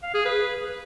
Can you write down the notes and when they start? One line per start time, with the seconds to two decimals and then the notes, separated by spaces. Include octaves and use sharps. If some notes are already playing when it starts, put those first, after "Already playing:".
0.03 F5
0.14 G#4
0.26 B4